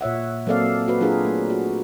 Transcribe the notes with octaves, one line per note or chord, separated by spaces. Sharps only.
A#2 C#5 E5 F#5
F#3 A#3 C4 A4 D5 F5
F#4 B4
F#3 D4 F4 G#4 A#4
A3
F#4